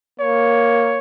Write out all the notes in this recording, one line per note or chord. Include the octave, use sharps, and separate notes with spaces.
A#3 C#5